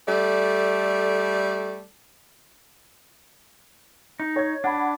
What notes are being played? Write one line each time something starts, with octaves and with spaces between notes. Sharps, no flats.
G3 A3 A4 D5
D#4
C#5 G#6
D4 F#5 B5